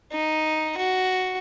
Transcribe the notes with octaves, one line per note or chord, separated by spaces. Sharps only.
D#4
F#4